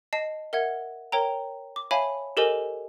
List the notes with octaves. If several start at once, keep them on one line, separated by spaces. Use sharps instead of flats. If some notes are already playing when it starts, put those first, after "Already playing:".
D#5 A5 C7
A#4 E5 F#5 G#6
A#4 C#5 G5 A#5
D6
C#5 E5 F5 G#5 A5 B5
G4 A4 A#4 C5 D#5 G#5